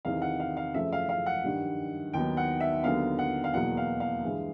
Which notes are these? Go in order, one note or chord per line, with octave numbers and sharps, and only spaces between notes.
E2 C3 D#3 F5
F#5
F5
F5
F#2 C#3 F3 A3 E5
F5
F5
F#5
G2 D#3 G3
D#2 D#3 F#3 B3 G5
F#5
E5
D#2 D3 F#3 B3 F5
F#5
F5
E2 B2 F#3 A#3 F#5
F5
F5
G2 E3 G#3